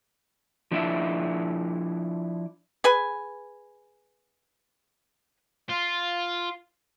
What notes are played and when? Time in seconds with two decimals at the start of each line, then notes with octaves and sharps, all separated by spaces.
0.71 F3 D4 E4 E5
2.84 G#4 B4 G#5
5.69 F4